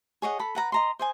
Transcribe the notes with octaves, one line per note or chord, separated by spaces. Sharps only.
G#4 C#5 D#5 F#5
A4 B5
B4 F#5 A#5
D#5 A#5 C6
C5 D#5 G#5